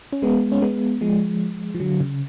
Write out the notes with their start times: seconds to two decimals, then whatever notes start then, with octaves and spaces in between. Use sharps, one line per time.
0.13 C#4
0.22 G#3 B3
0.52 C#4
0.62 G#3 B3
1.01 F3 G#3
1.75 F3
1.80 D3 F#3
2.00 C#3